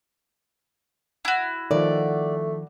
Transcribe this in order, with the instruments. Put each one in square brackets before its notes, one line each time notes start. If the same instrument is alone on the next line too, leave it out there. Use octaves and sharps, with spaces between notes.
[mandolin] E4 F#4
[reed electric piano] D#3 F3 [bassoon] A3 [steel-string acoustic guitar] D5